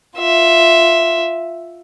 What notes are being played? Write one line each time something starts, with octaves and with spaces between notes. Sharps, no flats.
F4 E5